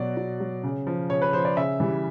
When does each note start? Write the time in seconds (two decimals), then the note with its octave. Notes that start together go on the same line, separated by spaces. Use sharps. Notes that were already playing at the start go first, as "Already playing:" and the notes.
Already playing: B2 F#3 D5
0.17 B2
0.40 F#3
0.63 C#3
0.87 F3
1.10 C#3 C#5
1.22 B4
1.33 F3 C5
1.45 D5
1.57 C#3 E5
1.80 E3 G3